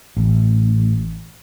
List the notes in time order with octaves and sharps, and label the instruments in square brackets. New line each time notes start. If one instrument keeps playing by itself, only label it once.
[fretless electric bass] A1